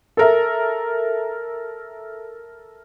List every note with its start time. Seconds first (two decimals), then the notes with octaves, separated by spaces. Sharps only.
0.17 A4 A#4 E5